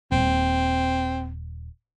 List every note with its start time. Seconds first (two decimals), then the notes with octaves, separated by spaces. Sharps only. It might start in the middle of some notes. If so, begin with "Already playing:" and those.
0.12 D#1 C4